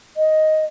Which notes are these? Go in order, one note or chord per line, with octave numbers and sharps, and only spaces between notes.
D#5